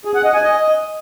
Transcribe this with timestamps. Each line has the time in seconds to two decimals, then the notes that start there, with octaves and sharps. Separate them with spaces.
0.05 G#4
0.15 F#5
0.24 D#5
0.34 G#5
0.43 D#5